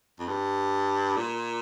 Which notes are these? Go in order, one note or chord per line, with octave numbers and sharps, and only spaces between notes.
F2
G2
A#2